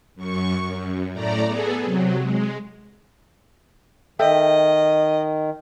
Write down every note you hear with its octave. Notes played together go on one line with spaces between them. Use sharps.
F#2 C#6
F#2
A2 A3 D5 A#5
B3 G#4 A4
C3 F#3
G#3
D#3 A4 D#5 E5 G5